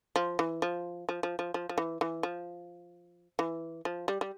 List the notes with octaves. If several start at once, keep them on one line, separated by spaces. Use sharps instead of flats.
F3
E3
F3
F3
F3
F3
F3
F3
E3
E3
F3
E3
F3
G3
G3